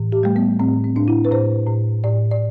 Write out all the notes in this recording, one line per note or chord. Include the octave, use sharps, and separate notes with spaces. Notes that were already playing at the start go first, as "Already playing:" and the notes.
Already playing: A2 E3
G4
G3 A3
B3
A2 C4
C4
A2 D4
E4
B4
A2 C5
A2
A2 D5
D5